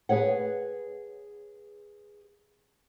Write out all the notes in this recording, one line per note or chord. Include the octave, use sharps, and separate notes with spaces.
G#4 B4 C#5 F#5